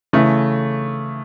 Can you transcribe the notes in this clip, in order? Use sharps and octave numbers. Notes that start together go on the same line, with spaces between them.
C#3 E3 A3